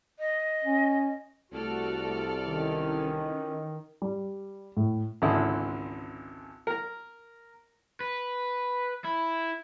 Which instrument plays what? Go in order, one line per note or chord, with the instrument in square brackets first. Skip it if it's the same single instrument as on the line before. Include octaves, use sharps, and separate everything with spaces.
[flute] D#5
[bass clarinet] C#4
[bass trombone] C2 [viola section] A3 F#4 [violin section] A4 D5 F6
[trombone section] D#3 [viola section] E3 C#4
[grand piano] G3
A2
[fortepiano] G#1 C#2 D3 E4 D#6
A#4 A#5
[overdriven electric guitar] B4
E4